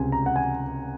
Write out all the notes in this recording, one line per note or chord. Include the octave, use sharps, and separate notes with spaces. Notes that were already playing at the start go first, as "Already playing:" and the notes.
Already playing: C#2 C3 G#5
A#5
F#5
G#5